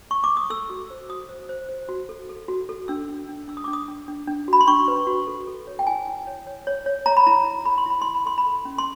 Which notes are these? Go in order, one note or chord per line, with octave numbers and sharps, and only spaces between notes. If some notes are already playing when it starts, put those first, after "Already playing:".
C#6
D6
D#6
A4 E6
F#4
C5
F#4 D#6
C5
C5
C5
F#4
A4
A4
F#4
A4
D4 E6
D4
D4
D4 E6
D#6
D6
D4
D#6
D4
D4
D4
F#4 B5
C6
D4 C#6
B4
F#4
A4
A4
C#5
G5
E4 G#5
E4
C#5
C#5
C#5
C#5
C#5 A#5
B5
E4 A#5
E4
A4 B5
C6
E4 B5
E4 C6
B5
A4 C6
B5
A4
C#4
C6